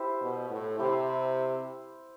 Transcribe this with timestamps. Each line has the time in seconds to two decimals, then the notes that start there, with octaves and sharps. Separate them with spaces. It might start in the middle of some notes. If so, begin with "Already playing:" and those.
Already playing: E4 G4 C5
0.21 B2
0.50 A2
0.79 C3 E4 G4 C5